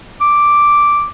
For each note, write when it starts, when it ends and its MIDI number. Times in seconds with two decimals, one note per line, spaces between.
0.21 1.07 86